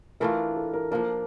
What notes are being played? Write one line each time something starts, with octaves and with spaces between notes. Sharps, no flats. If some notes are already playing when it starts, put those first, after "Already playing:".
E3 A3 D4 F4 A#4
A4
A#4
F3 A#3 D4 A#4